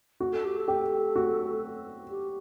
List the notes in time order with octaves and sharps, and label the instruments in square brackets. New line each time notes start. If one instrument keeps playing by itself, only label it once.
[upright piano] F#4
[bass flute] A4
G4
A4
[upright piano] G4
F#4
[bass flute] G4